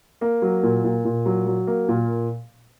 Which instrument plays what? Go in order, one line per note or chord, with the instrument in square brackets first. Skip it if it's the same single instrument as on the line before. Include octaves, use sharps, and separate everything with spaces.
[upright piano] A#3
F#3
A#2
A#2
A#2
F#3
F#3
A#3
A#2